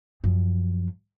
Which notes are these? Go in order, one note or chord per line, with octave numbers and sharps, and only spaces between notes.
F#2 F3